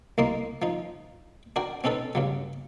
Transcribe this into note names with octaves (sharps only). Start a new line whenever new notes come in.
C2 A#3 D#5 C6
F3 D#4
D4 F#4 A#4 G5
C4 C#4 D#4 A4 B4
G2 C#3 F#3